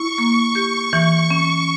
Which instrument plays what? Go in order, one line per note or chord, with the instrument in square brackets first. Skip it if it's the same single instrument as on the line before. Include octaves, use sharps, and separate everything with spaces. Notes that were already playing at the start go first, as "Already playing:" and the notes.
Already playing: [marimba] E4 [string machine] C#6
[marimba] A#3
G4
E3
C#4